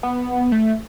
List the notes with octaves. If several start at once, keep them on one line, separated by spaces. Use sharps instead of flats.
B3
A3